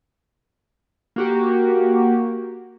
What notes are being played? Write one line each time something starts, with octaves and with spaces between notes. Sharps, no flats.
A#3 F#4 G4